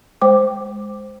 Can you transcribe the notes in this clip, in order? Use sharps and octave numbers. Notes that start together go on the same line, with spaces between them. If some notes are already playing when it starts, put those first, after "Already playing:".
G#3 C5 G5 D6